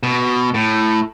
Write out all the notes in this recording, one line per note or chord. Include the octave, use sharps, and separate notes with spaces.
B2
A2